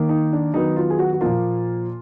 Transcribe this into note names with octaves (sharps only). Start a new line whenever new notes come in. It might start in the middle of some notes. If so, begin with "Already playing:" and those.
Already playing: D#3 A#3
D#4
D4
D#3 F#3 B3 D#4
F4
G#4
F#4
F#4
A#2 F3 A#3 F4